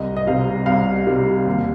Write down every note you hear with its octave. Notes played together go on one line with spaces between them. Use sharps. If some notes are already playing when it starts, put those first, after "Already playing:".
Already playing: C2 D#5
D#5
C3 G3 F5
C2 F5
C3 G3
D#2